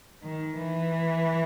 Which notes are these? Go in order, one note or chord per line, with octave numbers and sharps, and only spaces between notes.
D#3
E3